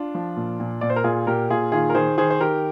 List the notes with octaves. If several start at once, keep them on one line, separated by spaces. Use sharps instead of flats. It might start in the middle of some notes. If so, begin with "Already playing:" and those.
Already playing: D4 F4
F3
A#2
A#2
A#2 D5
C5
A#4
A#2 F4 G#4
A#2 G4 A#4
A#2 F4 G#4
D#3 F4 G#4
A#4
D#3 G#4 C5
D#3 G#4 C5
C5
D#3 G4 A#4